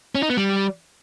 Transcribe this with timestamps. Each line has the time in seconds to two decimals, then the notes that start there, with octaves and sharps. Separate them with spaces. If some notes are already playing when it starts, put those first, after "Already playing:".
0.15 C#4
0.23 D#4
0.30 B3
0.37 G3